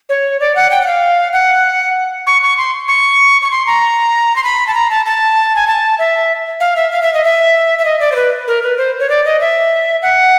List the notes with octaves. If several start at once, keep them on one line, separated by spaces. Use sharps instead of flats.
C#5
D5
F#5
G5
F#5
F5
F#5
C#6
C#6
C6
C#6
C#6
C6
A#5
C6
B5
A5
A#5
A5
A5
G#5
A5
E5
F5
E5
F5
E5
D#5
E5
E5
D#5
D5
C5
B4
A#4
B4
C5
C#5
D5
D#5
E5
F#5